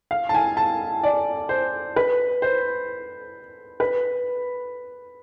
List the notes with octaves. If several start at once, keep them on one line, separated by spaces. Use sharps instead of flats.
F5
A5
G#5
A5
D5
C5
B4
C5
B4